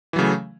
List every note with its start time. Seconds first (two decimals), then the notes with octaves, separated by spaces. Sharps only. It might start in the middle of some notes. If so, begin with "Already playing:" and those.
0.13 E3
0.16 F#3
0.19 C#3
0.21 A3